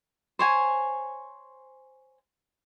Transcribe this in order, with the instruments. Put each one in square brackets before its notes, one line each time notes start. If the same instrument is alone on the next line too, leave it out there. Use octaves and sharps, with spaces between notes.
[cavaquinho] C5 C#5 G#5